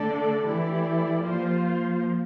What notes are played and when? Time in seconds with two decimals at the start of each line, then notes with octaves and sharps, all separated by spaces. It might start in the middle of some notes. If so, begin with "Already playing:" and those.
Already playing: D3 A3 D4 A4 D5
0.46 E3 A3 E4 G4 D5
1.22 F3 A#3 F4 C5
1.60 F3